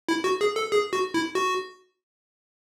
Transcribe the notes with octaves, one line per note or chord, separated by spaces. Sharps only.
E4
F#4
G#4
A4
G#4
F#4
E4
F#4